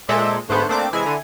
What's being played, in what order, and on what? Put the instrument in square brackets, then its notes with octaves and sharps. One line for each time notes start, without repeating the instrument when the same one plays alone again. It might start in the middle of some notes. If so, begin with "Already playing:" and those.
[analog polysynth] A#2 G#3 A4 [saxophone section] C5 D5 E5
[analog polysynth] G#2 B3 [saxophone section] D3 A3 C5
[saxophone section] A3 D4 [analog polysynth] A#3 C4 D6
[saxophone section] C3 E3 G#3 [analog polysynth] E4 G#5
[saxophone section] D3